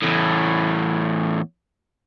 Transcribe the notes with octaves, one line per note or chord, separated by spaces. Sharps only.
E2 A2